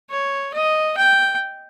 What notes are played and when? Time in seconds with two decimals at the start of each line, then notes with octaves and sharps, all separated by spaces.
0.10 C#5
0.54 D#5
0.97 G5